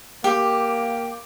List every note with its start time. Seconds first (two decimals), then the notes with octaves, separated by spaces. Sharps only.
0.24 A#3 G4